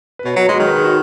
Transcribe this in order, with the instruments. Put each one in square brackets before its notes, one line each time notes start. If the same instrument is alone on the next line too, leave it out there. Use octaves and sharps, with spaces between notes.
[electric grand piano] B4
[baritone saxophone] B2 [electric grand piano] C#5
[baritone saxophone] F#3 [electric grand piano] B4
[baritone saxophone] G#3 [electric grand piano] F#4
[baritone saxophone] D#3 [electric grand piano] G#4
[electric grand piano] B4
G#4
F#4